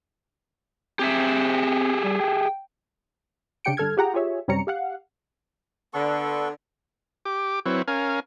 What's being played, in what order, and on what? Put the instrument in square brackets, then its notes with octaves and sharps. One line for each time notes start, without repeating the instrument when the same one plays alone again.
[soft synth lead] C4 [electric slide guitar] G4 G#4 E5
[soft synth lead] G3
G5
[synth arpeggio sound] C#3 D4 G4 G5 C#7 D7
G2 D3 A4 F6 G#6
F4 G4 G#4 F#5 G5 A#5
F4 G4 G#4 C#5 E5
F#2 C3 G3 C#4 A#5 C#7
G4 F5 F#5
[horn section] D3 [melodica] B3 A4 C#6
[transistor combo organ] G4 D6
F#3 C4 E4 B4 C#5
C#4 A#4 F5 G#5